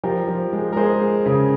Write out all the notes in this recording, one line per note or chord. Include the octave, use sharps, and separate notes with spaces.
F3 G4 A#4
F3
G#3
A#4
G#3 G#4 C5
G#3
C#3